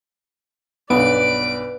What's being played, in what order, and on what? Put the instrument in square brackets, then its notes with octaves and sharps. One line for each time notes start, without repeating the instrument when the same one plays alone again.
[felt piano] B1 G2 [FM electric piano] B3 [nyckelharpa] B4 D5 [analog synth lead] D7